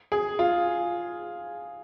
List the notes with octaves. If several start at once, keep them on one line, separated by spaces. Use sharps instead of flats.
G#4
F4